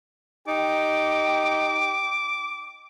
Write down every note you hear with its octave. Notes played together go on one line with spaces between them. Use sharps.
D#4 G4 D6